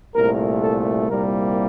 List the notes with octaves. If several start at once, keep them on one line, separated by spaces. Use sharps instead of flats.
C2 A#2 A3 A#4
A4
C2 A#2 G3 A#3 A#4